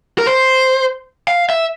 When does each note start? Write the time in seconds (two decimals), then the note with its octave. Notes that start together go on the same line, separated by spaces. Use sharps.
0.19 A#4
0.27 C5
1.28 F5
1.50 E5